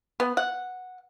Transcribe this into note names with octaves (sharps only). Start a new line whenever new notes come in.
B3
F#5